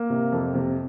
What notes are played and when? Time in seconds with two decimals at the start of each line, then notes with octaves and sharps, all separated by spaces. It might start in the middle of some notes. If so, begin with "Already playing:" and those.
Already playing: A#3
0.10 C3
0.32 F2
0.54 C3